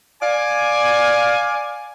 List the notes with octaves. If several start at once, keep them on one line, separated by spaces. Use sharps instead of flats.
D5 F5 G#5